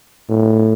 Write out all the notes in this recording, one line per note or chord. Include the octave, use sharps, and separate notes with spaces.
A2